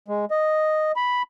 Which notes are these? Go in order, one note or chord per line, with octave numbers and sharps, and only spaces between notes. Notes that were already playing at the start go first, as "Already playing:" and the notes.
G#3
D#5
B5